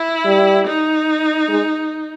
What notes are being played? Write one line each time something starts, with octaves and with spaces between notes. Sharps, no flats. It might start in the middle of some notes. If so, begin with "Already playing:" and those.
Already playing: E4
G3
D#4
G#3